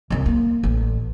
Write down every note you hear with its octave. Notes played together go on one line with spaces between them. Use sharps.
C2 F#2
A#3
A1